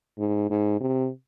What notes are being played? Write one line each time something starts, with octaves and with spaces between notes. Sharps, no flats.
G#2
G#2
C3